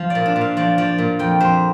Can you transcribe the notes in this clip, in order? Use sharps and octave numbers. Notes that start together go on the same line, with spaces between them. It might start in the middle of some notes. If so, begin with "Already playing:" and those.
Already playing: F3 F5
D5
A#2
D4
A#2
F5
F3 D5
F3 D5
A#2
F2 G5
F2 C5